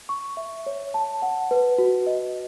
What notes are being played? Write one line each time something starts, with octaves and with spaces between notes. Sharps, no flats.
C#6
E5
C#5
A5
F#5
B4
F#4
D#5